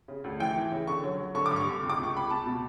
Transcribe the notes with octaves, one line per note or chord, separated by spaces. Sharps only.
C#3
D2
E3 G5
E3
C#3
D3 C#6
F#3
F#3
D3 C#6
G2 D6
C#6
D3
C#2
D6
C#2 C#6
C#2 B5
C#2 A5
B2